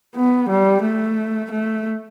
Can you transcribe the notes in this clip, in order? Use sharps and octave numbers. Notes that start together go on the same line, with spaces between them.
B3
G3
A3
A3